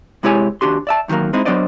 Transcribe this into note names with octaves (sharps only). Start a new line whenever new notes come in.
C3 G#3 E4 G4 C#5 G#5
D#2 D4 F#4 G4 C6
D5 E5 A5
E2 D#3 F3 F#3 A#3
G#3 C4 D#4 E4
F#3 B3 D4 C5 D5 D#5